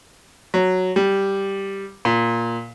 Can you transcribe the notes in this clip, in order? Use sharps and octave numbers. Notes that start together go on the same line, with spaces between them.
F#3
G3
A#2